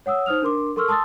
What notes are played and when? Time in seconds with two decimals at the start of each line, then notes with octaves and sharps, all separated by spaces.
0.06 C#5 F#5 D#6 E6
0.26 D#4 C5 D#6 F6 F7
0.42 D4 A#4 C6 D6
0.76 A4 A#4 C6 C#6 E6 F6
0.88 A5 C6 D#6 E6 A6